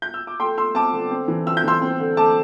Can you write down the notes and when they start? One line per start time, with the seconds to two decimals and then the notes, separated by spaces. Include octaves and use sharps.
0.02 G6
0.14 E6
0.27 D6
0.40 A3 G5 C6
0.57 A3 C6 E6
0.75 C4 A5 D6
0.93 D3
1.11 C4
1.28 E3
1.46 C4 E6
1.57 G6
1.64 E3 C6 E6
1.82 C4
2.00 D3
2.17 A3 A5 D6